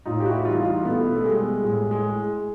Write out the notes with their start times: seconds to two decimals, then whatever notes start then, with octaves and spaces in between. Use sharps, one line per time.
0.06 A2 D#4 F4
0.20 G4
0.26 E4 F#4
0.45 E3 G3 D#4 F4
0.65 D#4 F4
0.85 B2 A3 B3
1.16 A3
1.25 G3 G#3
1.64 A2 G#3
1.91 G#3